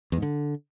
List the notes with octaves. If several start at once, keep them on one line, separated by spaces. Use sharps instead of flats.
E2
G#2
D3